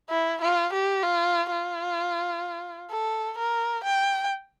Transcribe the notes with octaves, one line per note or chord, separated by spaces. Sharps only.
E4
F4
G4
F4
F4
A4
A#4
G5